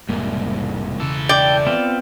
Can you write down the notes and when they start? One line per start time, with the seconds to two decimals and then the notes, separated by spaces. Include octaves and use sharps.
0.09 E1 C2 G#2 G3 A#3
1.00 E1 C#3 E3 A4
1.29 D5 G5
1.67 B3 C4 F4